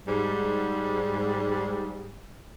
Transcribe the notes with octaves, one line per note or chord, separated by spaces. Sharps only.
G#2 G3